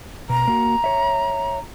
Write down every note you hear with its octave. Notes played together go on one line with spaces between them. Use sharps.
B2 A#5
A#3 F#4
C#5 E5